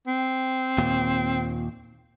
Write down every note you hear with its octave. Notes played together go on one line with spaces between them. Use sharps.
C4
D#2 A#2